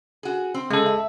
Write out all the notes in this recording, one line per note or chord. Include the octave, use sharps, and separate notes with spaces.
F#4 G#4
C4
C#3 G#3 A4
E5